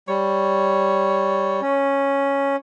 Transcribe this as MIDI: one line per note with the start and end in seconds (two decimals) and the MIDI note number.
0.08 1.61 55
0.08 2.02 73
1.62 2.56 61